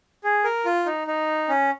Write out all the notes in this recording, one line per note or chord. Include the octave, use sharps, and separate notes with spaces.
G#4
A#4
F4
D#4
D#4
C#4